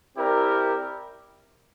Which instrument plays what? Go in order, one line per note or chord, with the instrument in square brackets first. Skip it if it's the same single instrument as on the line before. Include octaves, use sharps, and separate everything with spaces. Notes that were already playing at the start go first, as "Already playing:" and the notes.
[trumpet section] C4 E4 G4 A#4 D5